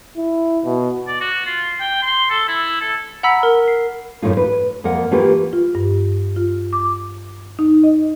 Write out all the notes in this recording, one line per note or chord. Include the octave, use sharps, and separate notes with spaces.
E4
B2
D5
F#4
F4
G5
C6
A4
E4
A4
F#5 A#5 B5 E6 B6
A#4
C7
F#2 A2 E3 A3 D#4 F4
B4
F2 A#3 A#4 F#5
E3 A3 A#3 F4 G4 B4
F4
G2
F4
D6
D#4
D#5